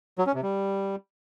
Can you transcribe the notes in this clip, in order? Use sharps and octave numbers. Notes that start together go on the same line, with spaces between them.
F#3
C#4
C3
G3